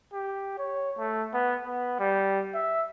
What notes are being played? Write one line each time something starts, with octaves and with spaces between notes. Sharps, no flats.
G4
C#5
A3
B3
B3
G3
E5